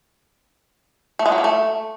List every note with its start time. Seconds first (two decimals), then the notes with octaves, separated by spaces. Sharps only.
1.19 A3
1.26 G#3
1.32 F#3
1.38 A#3
1.44 A3